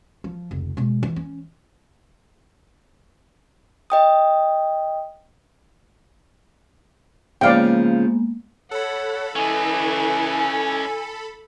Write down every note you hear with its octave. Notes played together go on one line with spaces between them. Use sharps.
F3
F1 C#2
B2 G#3
E3
C#4
D#5 G5 D#6
C#3 F3 G#3 A#3 B3 D5 F5 G5
A4 C#5 F#5 B5
E3 C#4 D#5 G#5